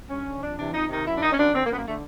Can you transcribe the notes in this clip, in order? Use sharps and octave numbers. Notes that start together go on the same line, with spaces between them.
G2 C#4
D3
F2 D4
C3 E3 D4
F2 D#4
C3 D#3 D#4
F#2 E4
D4
D#3 D#4
C#4
F#2 D4
D3 C4
A#3
F#2 B3
A#3
D3 A3